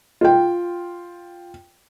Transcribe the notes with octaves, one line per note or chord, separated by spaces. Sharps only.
F4 G5